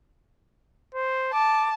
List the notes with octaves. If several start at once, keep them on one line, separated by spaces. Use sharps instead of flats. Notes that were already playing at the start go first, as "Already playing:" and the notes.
C5
A5 D6